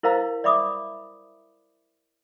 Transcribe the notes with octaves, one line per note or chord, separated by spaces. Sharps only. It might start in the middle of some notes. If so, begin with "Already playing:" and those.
E4 A#4 C5 D#5 F5 A#5
D5 E5 B5 D6 D#6